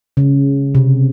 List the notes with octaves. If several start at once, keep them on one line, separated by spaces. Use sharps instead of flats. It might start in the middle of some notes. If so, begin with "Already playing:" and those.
C#3
C3